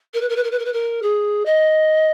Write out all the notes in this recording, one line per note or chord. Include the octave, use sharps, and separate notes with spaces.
A#4
B4
A#4
B4
A#4
B4
A#4
B4
A#4
G#4
D#5